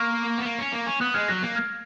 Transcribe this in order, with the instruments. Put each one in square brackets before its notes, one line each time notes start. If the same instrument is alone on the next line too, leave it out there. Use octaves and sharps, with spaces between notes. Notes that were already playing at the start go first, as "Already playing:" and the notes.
Already playing: [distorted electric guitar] A#3 [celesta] C#6 F6
[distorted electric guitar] B3
A#3
C#4
A#3
C#4
[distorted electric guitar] B3 [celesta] D#6 F#6
[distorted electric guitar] G#3 [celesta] F6 G#6
[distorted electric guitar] F#3 [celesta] F#6 A#6
[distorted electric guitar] A#3
[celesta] F6 G#6